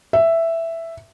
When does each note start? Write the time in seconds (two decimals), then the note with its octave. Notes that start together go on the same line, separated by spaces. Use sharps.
0.13 E5